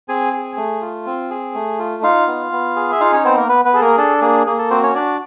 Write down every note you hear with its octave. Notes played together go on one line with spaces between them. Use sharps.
C4 G#4 G#5
G#4
A3
F4
C4
G#4
A3
F4
D#4 F4 F5
B3
B3
G#4
E5
D#4 F4 F5
C#4 C#5
B3 C4 C5
A#3 A#4
B3 B4
B3 B4
G#4 A4
A#3 A#4
D4 A4
A#3 G#4
A#3 G#4
A4
C4 F#4 C5
C#4 C#5
D4 D5